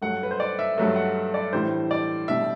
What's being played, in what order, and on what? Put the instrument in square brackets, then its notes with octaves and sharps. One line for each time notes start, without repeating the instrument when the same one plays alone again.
[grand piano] G2 F#3 A3 [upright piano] F#5
[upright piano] B4
C5
D5
E5
[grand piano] G2 F#3 A3 [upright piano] E5
[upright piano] F#5
D5
[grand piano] A2 E3 G3 D4 [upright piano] C5
[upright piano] D5
[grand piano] B2 G3 D4 [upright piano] E5